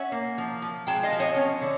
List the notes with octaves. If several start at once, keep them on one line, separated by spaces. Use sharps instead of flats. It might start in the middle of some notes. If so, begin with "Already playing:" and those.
Already playing: C#4 E5 F#5
A#3
F3
F3
G#3 G5 A5
D#5 F5
F3
C#5 D#5
C#4
D3